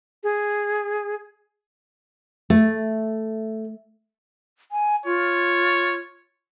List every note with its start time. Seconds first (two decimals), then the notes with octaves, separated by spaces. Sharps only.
0.24 G#4
2.50 A3
4.72 G#5
5.06 F4 C#5